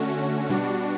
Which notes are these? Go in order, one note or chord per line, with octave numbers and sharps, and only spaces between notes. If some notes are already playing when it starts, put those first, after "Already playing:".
Already playing: D3 A3 C#4 F#4
B2 G3 D4 F#4